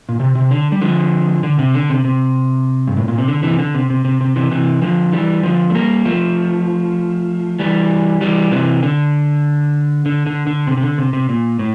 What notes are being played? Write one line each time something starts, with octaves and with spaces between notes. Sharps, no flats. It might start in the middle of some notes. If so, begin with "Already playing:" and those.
A#2
C3
C3
D3
G3
D3 F3
D3
C3
D3
C3
C3
G2
A2
A#2
C3
D3
C3 E3
D3
C3
C3
C3
C3
C3 E3
C3 E3
D3 F3
E3 G3
D3 F3
A3
G3 A#3
F3 A3
E3 G3
E3 G3
C3 E3
D3
D3
D3
D3
C3
C3
D3
C3
C3
A#2
A2